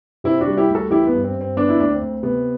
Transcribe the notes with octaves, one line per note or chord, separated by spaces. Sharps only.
C3 C4 E4
D4 F#4
G3
E4 G4
D2
F#4 A4
E3 E4 G4
B3
G2
C4
G2
C4
D3 B3 D4
E4
D2 D4
C4
D2
C3 B3